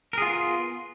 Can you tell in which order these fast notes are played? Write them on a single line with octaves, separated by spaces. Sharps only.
A#4 G#4 F4 B3